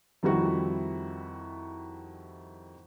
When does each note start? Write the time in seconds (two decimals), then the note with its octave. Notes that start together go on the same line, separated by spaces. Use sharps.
0.23 F2 D#3 G3 E4 F#4